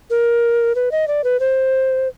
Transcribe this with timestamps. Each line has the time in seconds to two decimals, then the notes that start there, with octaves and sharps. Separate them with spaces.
0.10 A#4
0.75 B4
0.92 D#5
1.08 D5
1.24 B4
1.40 C5